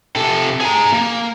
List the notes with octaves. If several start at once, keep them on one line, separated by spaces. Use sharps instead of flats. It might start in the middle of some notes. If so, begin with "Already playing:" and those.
C3 A4
G#4 A#5
A#3